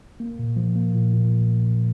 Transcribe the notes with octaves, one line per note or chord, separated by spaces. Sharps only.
A#3
A#2
F3
A#3
A#2
A#2